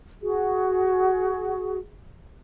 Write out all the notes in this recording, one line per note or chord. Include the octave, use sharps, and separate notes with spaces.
F#4 G#4